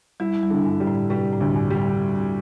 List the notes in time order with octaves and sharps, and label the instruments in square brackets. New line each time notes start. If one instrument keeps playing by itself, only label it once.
[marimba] G3 [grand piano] E4
[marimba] G3
[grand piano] D3
[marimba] G2
[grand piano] G3
[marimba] A2
[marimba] C3 [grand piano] G3
[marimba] A2
[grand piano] D2
[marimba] A2
G2
[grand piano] G3
[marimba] A2